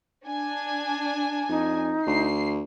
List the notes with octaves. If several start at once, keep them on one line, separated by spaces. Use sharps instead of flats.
D4 G#5
F2 D#4
D2 C7